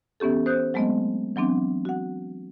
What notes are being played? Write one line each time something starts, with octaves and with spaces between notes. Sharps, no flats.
E3 B3 C#4 G4 A4
C5 D#6 F#6 G6
F#3 G#3 A3 B3 C4 D#5
E3 F#3 B3 C4 D4
F#4 F#5